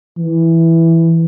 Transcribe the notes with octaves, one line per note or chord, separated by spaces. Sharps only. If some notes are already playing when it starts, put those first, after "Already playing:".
E3